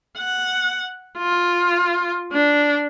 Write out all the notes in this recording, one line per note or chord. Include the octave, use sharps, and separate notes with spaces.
F#5
F4
D4